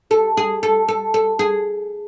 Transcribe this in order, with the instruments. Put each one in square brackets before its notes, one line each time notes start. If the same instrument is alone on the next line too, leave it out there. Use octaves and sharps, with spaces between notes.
[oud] A4
G#4
A4
A4
A4
G#4